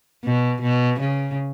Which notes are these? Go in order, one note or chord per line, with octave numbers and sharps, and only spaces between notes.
B2
B2
C#3